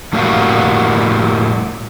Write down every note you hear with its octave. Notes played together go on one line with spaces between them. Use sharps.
F2 A2 G3 A#3 F#4 F5